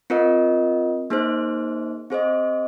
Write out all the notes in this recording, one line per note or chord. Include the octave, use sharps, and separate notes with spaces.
C4 F4 A#4 D#5
A#3 D#4 G#4 C5
C4 G#4 C5 D#5